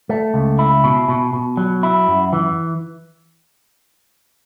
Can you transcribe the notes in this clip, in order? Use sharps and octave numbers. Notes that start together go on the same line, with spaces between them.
A3
C#2
E4
B2
B2
B2
F#3
E4
F#2
E3